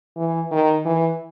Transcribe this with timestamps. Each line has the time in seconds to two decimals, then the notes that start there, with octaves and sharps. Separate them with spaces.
0.17 E3
0.51 D#3
0.86 E3